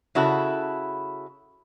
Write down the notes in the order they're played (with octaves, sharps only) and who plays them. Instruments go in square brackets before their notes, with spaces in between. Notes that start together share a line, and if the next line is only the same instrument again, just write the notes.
[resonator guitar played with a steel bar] C#3 E4 F#4 A4